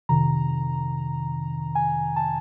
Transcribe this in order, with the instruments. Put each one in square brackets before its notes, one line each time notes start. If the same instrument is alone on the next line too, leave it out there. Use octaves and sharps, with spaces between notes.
[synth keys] F2 C3 D#3 A#5
G#5
A5